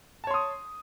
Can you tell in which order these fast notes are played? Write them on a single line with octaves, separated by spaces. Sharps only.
A5 C#5 C6 D#6